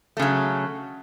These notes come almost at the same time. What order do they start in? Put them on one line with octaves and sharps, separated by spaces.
A3 C#3 F#3